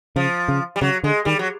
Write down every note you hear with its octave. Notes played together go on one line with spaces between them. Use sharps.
C#3 F3
C#3
G3
C#3 F#3
D3 G#3
D#3 G3
F#3